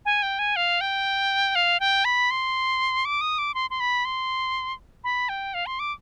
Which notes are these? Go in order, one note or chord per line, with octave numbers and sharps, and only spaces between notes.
G#5
G5
G#5
F5
G5
F5
G5
B5
C6
D6
D#6
D6
C6
C6
B5
C6
B5
G5
F5
C6
D6